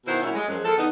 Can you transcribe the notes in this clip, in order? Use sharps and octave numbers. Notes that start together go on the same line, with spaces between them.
B2 D#3 E4 C5 E5 F#5
A#2 F#3 C#4 E4
G#3
F#2 F3 F#3 G#3
F3 G#3 A#3 A4
D3 B3 D#4